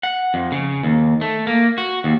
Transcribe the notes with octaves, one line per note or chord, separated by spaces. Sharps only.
F#5
F2
C#3
D#2
A3
A#3
F#4
D#2